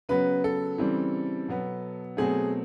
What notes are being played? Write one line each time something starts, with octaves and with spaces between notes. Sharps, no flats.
C#3 F#3 B3 B4
A4
C#3 E3 G3 C4
B2 F#3 B3
B2 F#3 A3 C4 G#4